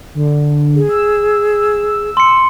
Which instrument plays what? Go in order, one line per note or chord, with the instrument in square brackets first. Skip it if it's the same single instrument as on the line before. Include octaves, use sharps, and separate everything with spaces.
[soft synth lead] D3
[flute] G#4
[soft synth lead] E6
[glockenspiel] C6 C#7